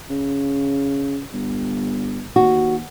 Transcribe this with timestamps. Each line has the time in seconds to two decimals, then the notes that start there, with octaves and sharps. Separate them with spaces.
0.10 C#3
1.33 G1
2.36 D#2 F#4